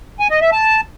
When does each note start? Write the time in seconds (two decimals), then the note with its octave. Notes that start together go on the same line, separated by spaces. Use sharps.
0.20 G#5
0.31 D#5
0.41 E5
0.52 A5